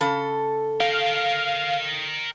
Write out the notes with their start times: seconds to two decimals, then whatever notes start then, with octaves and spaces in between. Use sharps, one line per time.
0.01 C#3 A4
0.80 A#4 F5 G5